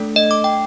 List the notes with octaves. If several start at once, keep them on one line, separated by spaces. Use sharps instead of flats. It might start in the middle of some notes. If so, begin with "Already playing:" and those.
Already playing: A3 D4 A4
D#5
D6
G5